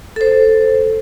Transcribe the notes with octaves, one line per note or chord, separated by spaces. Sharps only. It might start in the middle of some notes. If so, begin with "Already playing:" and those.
A4 C5